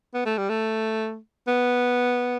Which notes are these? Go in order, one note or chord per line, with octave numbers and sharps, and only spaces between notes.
B3
A3
G3
A3
B3